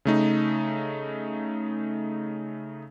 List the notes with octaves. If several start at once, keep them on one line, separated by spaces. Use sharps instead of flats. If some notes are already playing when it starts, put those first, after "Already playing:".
C#3 A3 D#4